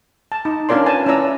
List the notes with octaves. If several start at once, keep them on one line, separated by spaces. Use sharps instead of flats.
A5
D#4
C#4 D4 F4 A#4 D5 C6
B4 G#5 A5
C#4 E4 B4 D5 A#5 E6